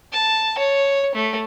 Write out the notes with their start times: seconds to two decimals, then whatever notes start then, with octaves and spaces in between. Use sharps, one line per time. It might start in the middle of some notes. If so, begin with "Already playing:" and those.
0.13 A5
0.58 C#5
1.15 A3